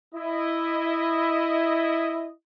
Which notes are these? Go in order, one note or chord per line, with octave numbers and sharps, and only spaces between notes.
E4 D#5